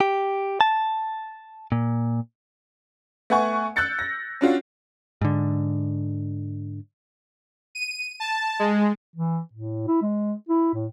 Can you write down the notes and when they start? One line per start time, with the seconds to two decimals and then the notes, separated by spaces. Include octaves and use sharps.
0.01 G4
0.61 A5
1.72 A#2
3.30 A3 B3 F#5 G#5 C#6
3.76 E6 F#6 G6 A6 C#7
3.99 A#6
4.41 C#4 D4 F4 F#4
5.21 G#2 D3
7.75 D#7
8.20 A5
8.59 G#3
9.16 E3
9.53 A2
9.88 E4
10.02 G#3
10.49 E4
10.74 A2